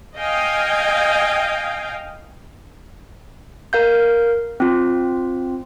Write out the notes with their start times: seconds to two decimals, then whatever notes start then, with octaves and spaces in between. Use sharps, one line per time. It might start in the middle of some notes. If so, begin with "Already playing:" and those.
0.18 D#5 F5 G5 G#5
3.73 A#4 F5 G6
4.60 C4 F4